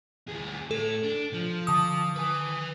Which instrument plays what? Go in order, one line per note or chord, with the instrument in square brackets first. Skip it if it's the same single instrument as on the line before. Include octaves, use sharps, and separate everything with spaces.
[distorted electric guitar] D2 G#4
[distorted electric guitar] A2 [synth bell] A4
[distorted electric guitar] D4
F3
[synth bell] D3 D#6
[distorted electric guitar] B4 G#5